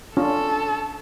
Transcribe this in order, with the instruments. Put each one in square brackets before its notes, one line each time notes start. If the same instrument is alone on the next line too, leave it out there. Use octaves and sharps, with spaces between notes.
[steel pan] C#4 D4 F4 [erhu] A4